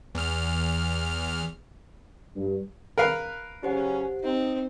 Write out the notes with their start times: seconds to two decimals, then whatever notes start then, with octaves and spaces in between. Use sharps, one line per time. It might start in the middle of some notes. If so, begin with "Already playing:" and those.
0.15 E2 F6
2.35 G2
2.98 A#4 B4 F5
3.63 C#3 F#3 C#4 G4 C5 F#5
4.24 C4 D#4